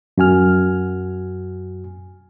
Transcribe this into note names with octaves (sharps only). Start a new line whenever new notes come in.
F#2 F#4 G#5 F6